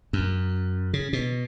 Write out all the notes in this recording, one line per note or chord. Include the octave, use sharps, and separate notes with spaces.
F#2
C#3
B2